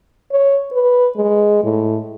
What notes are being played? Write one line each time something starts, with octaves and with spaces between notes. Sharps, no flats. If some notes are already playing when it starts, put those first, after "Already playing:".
C#5
B4
G#3
A2